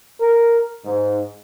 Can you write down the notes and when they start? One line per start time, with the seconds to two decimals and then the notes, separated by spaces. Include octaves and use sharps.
0.21 A#4
0.85 G#2